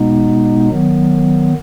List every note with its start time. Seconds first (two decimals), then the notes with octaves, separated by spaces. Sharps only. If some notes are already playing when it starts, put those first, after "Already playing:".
Already playing: B2 G#3 B3 D#4
0.70 D#3 F#3 B3